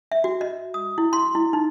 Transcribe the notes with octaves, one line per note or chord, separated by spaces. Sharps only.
E5
F#4
D#5
D#6
E4
C6
E4
D#4